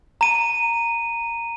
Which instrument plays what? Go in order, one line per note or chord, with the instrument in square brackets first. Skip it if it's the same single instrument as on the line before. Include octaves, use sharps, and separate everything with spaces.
[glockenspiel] A#5 D#7